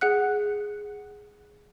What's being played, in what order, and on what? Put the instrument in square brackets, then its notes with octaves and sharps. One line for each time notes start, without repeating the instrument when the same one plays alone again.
[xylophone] G#4 F#5 F#6